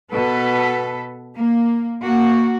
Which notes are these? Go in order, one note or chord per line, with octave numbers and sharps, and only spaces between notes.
B2 A4 B4
A#3
A#3 F#4